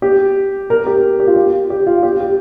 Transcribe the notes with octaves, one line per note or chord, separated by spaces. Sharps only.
G4
A#4
G4
G4
F4
G4
G4
F4
G4
G4